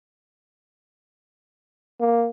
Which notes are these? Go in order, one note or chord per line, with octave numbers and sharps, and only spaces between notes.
A#3